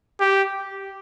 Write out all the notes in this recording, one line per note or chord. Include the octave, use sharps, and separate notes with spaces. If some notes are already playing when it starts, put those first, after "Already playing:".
G4